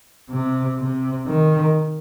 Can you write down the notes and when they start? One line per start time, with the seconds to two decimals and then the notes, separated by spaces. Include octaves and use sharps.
0.30 C3
0.78 C3
1.27 D#3